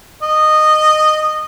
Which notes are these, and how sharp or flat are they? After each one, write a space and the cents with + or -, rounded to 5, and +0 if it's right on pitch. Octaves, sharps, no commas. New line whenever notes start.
D#5 -15